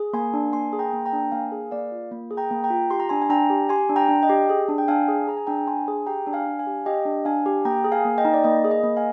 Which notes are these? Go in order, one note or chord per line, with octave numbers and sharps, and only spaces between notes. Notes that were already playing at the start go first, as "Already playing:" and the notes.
Already playing: G#4
A#3 G#5 C6
D4
A#3 G#5 C6
G#4
G5 A#5
A#3
G5 A#5
D4
A#3 F5 G#5
G#4
A#3 D5 F5
F4
A#3
G#4
G5 A#5
A#3
G5 A#5
F4
G4 C6
A#5
D4 G#5 C6
G#5
D4 G5 A#5
G4
G4 G#5 C6
D4
G5 A#5
D4
D#5 G5
G4
G#4
D4
G5
D4 F5 G#5
G#4
G#4 A#5
G#5
D4 G5 A#5
D4 G#5 C6
G#4
G4 G5 A#5
D4
F5 G#5
D4
F5 G#5
G4
G4 D#5 G5
D4
D4 F5 G#5
G4
A#3 G5 A#5
G#4
F5 G#5
A#3
D#5 G5
D#4
D5
A#3 D#5
G#4
D#5
A#3
F5 G#5